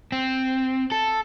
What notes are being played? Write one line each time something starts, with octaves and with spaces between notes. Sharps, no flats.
C4
A4